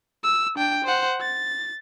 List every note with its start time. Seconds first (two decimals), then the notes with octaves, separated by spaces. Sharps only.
0.24 E6
0.56 D4 G5
0.85 C5 F#5
1.21 A6